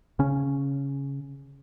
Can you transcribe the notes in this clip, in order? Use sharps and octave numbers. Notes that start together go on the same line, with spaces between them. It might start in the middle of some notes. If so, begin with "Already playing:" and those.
C#3 C#4